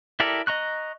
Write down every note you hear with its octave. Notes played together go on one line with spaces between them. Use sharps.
E4 G4 A4 A#4 D5
D#5 A#5 C#6 F#6